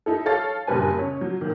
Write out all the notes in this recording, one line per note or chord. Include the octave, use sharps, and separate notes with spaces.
D#4 E4 A4
A4 C#5 F5 A6
F#1 G2 A#2 G3 B4 G#5
C#3 C#5
F#3
A#2 D#3